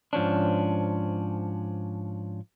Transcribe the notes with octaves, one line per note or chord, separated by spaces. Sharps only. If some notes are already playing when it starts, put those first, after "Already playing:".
G#2 F3 C#4 D4